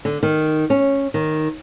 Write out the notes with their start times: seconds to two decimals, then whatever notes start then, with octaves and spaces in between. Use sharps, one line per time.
0.05 D3
0.23 D#3
0.70 C#4
1.14 D#3